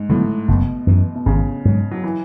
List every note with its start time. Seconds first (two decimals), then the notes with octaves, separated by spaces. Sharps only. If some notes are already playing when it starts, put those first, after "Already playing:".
Already playing: G#2
0.09 A2 D3 F#3 B3
0.48 F#1 B2
0.87 F#2 E3
1.15 B2
1.26 G#1 C#3
1.65 G#2 F#3
1.91 F#3
2.03 E3